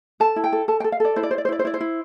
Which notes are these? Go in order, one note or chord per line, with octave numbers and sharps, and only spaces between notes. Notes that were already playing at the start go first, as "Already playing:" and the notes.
A4 A5
E4
G5
A4
A4 A5
G5
A4
F5
A4 D5
E4 C5
D5
E4 C5
D5
C5
E4 D5
C5
E4 D5
C5
E4